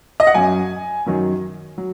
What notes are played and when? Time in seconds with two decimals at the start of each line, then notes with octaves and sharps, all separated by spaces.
0.20 D#5
0.27 F#5
0.34 F#2 F#3 G#5
1.06 F#2 D#3 F#3
1.78 F#3